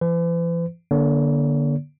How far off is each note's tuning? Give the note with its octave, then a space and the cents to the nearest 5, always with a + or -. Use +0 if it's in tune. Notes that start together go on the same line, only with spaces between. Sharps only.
E3 +45 B4 +45
D3 +0 A#3 +40 C#5 +45